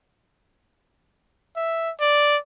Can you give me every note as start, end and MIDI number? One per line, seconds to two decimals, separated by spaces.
1.57 1.91 76
2.00 2.37 74